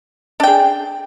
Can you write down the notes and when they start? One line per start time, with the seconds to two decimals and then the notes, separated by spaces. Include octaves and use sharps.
0.40 D4
0.43 G5
0.47 G#4